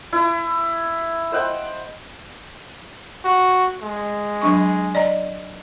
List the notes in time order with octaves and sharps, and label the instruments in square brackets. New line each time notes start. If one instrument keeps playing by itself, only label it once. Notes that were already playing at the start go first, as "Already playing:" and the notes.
[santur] E4
C5 D#5 F#5 G5
[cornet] F#4
G#3
[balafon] F#3 D4 C#6
D5 D#5 A#5